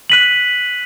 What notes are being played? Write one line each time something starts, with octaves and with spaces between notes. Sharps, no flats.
F#6 B6 D#7 F#7